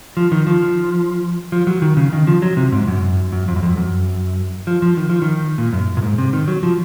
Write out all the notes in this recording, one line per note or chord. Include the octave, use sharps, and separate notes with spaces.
F3
D#3
F3
F3
F#3
D#3
C#3
D#3
F3
F#3
C3
G#2
F#2
F#2
F2
F#2
F2
F#2
F3
F3
D#3
F3
D#3
A#2
F#2
A#2
G#2
C3
D#3
F#3
F3